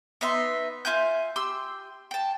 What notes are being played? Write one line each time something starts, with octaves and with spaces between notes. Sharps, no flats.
B3 D#4 E5 C6
F4 E5 G#5 G6
G4 C6 E6
G5 A5